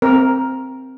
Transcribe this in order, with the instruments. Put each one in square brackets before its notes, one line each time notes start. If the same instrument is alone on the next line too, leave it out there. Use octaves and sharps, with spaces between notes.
[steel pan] C4 A#4